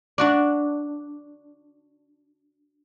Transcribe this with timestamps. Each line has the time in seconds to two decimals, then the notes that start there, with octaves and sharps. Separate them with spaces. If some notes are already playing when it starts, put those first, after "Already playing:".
0.18 D4 F#4 D5